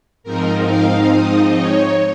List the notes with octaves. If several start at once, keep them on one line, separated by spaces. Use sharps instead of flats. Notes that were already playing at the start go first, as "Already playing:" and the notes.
G#2 F3 C4 D#4 A#4
F5
D#5
C#5